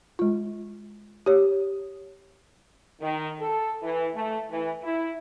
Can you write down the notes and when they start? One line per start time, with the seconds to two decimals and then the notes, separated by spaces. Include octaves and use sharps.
0.19 G#3 F4
1.26 G4 C#5
3.01 D#3
3.40 A4
3.82 E3
4.15 A3
4.50 E3
4.83 E4